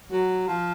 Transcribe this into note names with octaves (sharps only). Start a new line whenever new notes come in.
F#3
F3